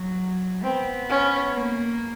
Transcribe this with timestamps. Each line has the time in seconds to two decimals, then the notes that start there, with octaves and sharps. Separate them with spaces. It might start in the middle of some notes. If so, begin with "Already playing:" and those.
Already playing: F#3
0.63 B3 C4
1.09 C#4
1.56 A#3